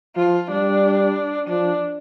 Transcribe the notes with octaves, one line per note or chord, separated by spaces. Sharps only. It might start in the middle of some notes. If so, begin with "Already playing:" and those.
F3 F4
G3 D4
F3 D4